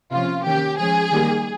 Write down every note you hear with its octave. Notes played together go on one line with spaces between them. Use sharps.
C3 F3 A#3 C#4 F4
D#3 A#3 C#4 G4
F3 G#3 C#4 G#4
D#3 G3 A#3